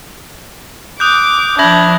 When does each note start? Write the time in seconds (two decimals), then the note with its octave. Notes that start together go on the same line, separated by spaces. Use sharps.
1.00 D6 D#6 F#6 G6
1.59 F3 D4 E5 B5 G#6 A#6 F#7